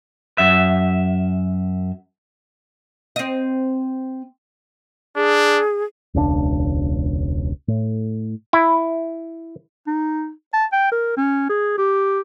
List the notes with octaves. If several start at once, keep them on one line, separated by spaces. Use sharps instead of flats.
F#2 E5
C4 D#5
D4 G#4
E1 C#2 B2 D4
A2
E4
D#4
A5
G5
A#4
C#4
G#4
G4